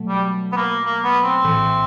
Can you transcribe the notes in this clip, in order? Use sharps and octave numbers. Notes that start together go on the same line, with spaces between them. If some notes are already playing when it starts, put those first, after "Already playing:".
Already playing: B2 F#3 A3
G3
B3
A#3
A#3
B3
C4
A#1 A2 E3